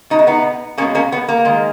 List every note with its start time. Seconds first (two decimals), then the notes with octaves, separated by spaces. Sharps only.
0.10 B2 G#3 D#4
0.19 E4
0.27 B3 D#4
0.78 B2 A#3 C#4
0.81 G#3
0.95 A#3 C#4
1.12 B3
1.28 A#3
1.45 D#3 G#3